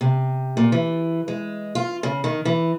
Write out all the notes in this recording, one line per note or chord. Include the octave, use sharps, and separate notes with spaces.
C3
A#2
E3
G#3
F4
C#3
D#3
E3